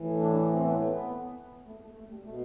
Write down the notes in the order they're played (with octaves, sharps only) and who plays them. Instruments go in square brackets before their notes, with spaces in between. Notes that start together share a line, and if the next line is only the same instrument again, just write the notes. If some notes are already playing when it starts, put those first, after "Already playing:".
Already playing: [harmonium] A2 E3
D4
C4
B3
A3
B3
A3
A3
A3
G3
B2 A3